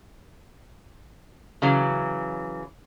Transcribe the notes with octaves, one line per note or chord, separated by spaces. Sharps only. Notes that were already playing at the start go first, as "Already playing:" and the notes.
C#3 E3 F#3